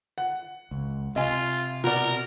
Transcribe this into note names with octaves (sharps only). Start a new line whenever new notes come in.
F#5
C#2
C3 F4 D#5 G#5
B2 A#4 D5